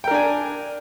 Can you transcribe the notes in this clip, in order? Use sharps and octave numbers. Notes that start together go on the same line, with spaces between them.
D4 A#4 G5 G#5